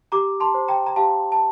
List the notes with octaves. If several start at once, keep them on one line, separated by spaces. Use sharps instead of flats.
G4 A#5 D6
A5 C6
C5
G5 A#5
A#5
G4 F5 A5
A5